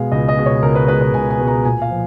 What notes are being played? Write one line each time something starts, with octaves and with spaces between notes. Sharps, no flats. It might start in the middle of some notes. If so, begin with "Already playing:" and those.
Already playing: B2 G#3 F5 G#5
C#2 D#5
D#5
B2 G#3
C#5
C#2 A#4
B4
B2 G#3 B4
B4
C#2 G#5
G#5
B2 G#3
A#5
A#2 G#5
F5
F3